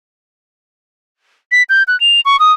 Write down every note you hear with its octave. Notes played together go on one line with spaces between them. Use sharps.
B6
G6
F#6
F7
C#6
D#6